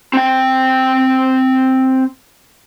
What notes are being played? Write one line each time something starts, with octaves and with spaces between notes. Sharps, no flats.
C4 G5